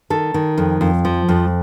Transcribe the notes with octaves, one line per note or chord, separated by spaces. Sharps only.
D#3 A4
D#3
F2
F2
F3
F2